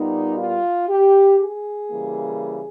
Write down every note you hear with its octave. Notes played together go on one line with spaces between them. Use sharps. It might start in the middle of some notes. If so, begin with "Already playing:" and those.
Already playing: A#2 G3 B3 D#4
F4
G4
G#4
C#3 E3 G3 A#3